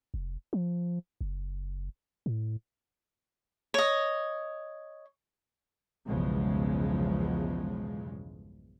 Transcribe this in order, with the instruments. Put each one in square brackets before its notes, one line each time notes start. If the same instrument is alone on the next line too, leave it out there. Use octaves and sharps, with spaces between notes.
[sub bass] F1
F3
F#1
A2
[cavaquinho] C#5 D#5
[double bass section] B1 E2 G2 C#3 F3 G#3